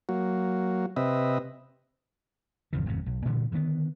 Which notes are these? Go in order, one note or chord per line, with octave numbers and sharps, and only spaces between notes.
F#3 A#3 F#4
C3 C4 B4 D#5 E5
G#1 F2 C#3 E3
G#1 F2 A2 C3
B1
A#2 D3 E3 G3
D3 D#3 G3 B3